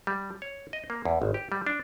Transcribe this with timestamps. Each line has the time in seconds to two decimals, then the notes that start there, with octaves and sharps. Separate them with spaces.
0.07 G3
0.42 C#5
0.73 D#5
0.90 A#3
1.05 E2
1.22 G#1
1.34 G4
1.52 G3
1.67 D4